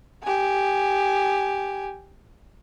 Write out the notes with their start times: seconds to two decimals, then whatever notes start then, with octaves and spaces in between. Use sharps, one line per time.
0.23 G4 G#5